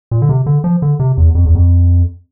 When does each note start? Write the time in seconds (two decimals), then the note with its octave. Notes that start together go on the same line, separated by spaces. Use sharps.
0.11 A#2
0.22 D3
0.29 C3
0.46 D3
0.64 F3
0.82 D3
1.00 C3
1.17 E2
1.35 F2
1.46 E2
1.55 F2